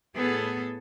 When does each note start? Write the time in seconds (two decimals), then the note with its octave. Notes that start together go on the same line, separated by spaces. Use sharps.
0.15 A2 B3 G#4 A4